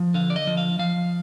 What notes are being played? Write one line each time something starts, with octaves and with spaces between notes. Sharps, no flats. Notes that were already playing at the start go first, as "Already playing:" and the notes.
Already playing: F3
D3 F5
D5
D#5
F3
F5
F3 F5